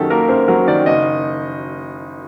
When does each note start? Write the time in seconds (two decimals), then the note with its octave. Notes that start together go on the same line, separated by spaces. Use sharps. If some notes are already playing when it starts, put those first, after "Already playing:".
Already playing: F#2 D#3 F#3 A#3 G4 A4
0.10 A#3 A#4
0.29 F#2 C5
0.48 F#3 A#4
0.67 D#3 D5
0.86 F#1 D#5